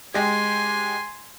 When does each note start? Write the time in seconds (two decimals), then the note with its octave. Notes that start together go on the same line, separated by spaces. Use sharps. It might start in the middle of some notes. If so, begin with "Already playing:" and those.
0.14 G#3 G4 G#5 C6